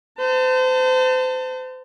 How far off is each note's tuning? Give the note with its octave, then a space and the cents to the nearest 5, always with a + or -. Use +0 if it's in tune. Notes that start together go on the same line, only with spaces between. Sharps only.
C5 -35 A5 +30